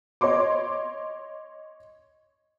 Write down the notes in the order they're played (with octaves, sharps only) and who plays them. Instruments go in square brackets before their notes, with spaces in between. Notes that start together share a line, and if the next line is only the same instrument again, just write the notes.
[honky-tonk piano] C#5 D#5 C6 D6